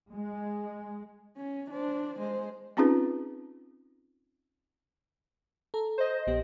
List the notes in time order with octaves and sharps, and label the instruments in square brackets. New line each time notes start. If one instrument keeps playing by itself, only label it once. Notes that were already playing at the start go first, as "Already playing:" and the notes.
[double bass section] G#3
[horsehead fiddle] C#4
D4 C5
G#3 C5
[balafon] C4 C#4 D#4 F4 G#4 B4
[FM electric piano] A4 A#5
[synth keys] C5 D#5
[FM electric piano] A#1 B3 G4